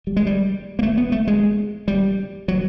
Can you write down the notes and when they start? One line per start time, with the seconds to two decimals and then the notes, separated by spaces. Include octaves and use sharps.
0.07 G3
0.17 G#3
0.26 G3
0.79 A#3
0.83 A3
0.97 B3
1.12 A3
1.27 G#3
1.88 G3
2.48 F#3